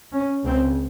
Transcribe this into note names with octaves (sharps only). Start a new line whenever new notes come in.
C#4
C#2 C#3 C4